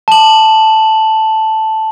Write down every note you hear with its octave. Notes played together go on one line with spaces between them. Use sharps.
A5 F#7